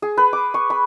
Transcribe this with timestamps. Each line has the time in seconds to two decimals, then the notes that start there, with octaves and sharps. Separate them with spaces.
0.02 G#4
0.17 B4
0.33 D6
0.54 C#6
0.70 B5